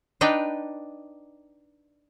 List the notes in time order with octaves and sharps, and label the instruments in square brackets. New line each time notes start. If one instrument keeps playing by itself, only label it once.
[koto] D4 D#4 B4 D5 G5